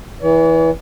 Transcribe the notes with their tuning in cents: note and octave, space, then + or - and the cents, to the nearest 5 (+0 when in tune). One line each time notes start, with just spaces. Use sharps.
E3 -15 C#5 +45